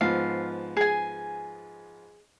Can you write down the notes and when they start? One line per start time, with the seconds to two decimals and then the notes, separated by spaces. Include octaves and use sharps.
0.01 G#2 F3 B3 F5
0.77 G#4 G#5